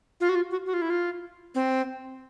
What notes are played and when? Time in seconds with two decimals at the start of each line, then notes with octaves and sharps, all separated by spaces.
0.21 F4
0.29 F#4
0.35 F4
0.51 F#4
0.66 F#4
0.74 F4
0.82 E4
0.90 F4
1.55 C4